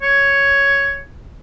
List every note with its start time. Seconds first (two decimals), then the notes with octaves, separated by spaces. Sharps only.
0.02 C#5